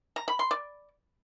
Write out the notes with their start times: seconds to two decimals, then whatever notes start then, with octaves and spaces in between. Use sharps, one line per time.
0.16 A#5
0.28 B5
0.39 C6
0.51 D5